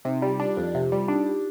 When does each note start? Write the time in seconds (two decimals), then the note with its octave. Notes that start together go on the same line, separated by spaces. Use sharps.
0.05 C3 D#4
0.18 G3 F4
0.32 G4
0.40 D4 F4
0.57 F2 F4
0.74 C3 G4
0.92 G3 F4
1.08 D4 D#4
1.27 G4